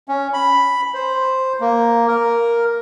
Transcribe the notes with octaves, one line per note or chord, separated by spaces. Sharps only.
C#4
B5
C5
A#3
A#4